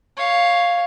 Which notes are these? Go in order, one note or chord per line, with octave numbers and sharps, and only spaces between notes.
C#5 F5